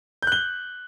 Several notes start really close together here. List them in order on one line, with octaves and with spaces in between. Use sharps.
G6 F#6 G7